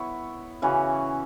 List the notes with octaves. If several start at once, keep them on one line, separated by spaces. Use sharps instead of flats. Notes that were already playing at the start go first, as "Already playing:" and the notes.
Already playing: B3 E4 C#5 E5
C#3 E3 C#4 F#4